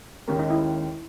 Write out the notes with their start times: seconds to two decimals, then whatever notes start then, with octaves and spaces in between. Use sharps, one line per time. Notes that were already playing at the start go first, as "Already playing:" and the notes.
0.27 D#2 D#3 G#3 C#4 G4 A#4
0.39 D#4
0.50 E4